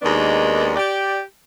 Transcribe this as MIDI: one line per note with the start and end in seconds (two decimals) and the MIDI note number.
0.02 0.72 39
0.02 0.72 51
0.02 0.72 56
0.02 0.72 59
0.02 0.72 62
0.75 1.18 67
0.75 1.18 74